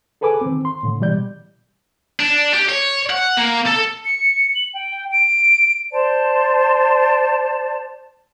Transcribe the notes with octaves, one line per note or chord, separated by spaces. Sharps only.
G#4 A4 B4 G#5 D6
D#3 C4
C6
A2 D3
B2 E3 G3 D5 G6
D4
G4
C#5
F#5
A#3
A4
C#7
F#7
G5
D7
C5 D5 A5